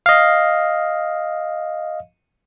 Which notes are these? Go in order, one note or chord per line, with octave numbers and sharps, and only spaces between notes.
D#5 F5